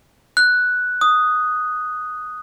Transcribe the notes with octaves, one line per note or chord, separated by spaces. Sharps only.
F#6
D#6